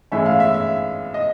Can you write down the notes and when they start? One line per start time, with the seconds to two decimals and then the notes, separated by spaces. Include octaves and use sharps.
0.12 A2 E3 G#3 C#4 E5
0.26 F5
0.40 E5
0.54 E5
1.14 D#5